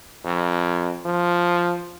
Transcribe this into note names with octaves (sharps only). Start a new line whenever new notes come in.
F2
F3